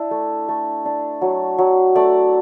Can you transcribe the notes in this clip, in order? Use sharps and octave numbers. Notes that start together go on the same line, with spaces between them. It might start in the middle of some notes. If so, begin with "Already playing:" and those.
Already playing: D4 E4
A3
A3
D4
F#3
F#3
A3 D5